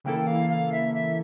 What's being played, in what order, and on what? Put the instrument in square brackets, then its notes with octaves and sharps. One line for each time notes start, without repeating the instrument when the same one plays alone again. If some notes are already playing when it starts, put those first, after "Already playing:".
[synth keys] C#3 E3 A#3 E4 A4 [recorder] G5
[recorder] F5
F5
E5
E5